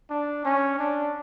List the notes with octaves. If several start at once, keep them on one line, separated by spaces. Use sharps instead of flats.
D4
C#4
D4